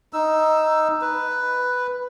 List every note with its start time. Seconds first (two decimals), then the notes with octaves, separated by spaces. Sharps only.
0.13 D#4 E6
1.01 B4